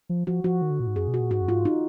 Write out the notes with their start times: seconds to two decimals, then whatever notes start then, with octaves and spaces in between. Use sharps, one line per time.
0.09 F3
0.27 F3 F#4
0.44 F3 F#4
0.62 D#3
0.70 D3
0.80 A#2
0.87 G#2
0.96 F#2 G#4
1.08 B2
1.14 F#4
1.20 A#2
1.31 G#2 F#4
1.41 F#2
1.48 G#2 F4
1.65 D#4